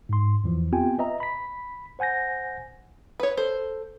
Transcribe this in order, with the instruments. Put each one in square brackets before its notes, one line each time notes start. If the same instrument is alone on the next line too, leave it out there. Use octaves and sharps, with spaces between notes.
[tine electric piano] G#2 C6
E2 E3 F3
B3 C4 F4 G4 G5 G#5
B4 D#5 E5 A#5
B5 B6
C5 F#5 G#5 G6 A#6
[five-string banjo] B4 C#5
[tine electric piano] A4 [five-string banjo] C5